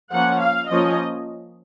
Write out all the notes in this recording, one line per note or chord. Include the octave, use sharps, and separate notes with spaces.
F3 A#3 C#4 F#5
F5
F3 A#3 C#4 D#5